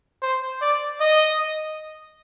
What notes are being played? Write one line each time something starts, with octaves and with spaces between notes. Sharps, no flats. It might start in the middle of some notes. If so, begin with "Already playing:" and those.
C5
D5
D#5